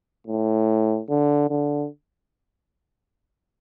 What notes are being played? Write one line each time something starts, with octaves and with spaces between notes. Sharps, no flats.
A2
D3
D3